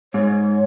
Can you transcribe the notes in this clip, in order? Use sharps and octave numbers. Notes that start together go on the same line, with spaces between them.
G#2 C#5